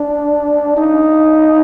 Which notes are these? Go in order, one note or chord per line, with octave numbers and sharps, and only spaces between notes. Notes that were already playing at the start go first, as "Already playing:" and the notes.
Already playing: D4
D#4